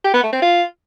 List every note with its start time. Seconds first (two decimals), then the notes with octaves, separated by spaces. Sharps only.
0.04 G4
0.14 B3
0.23 A3
0.32 C4
0.42 F4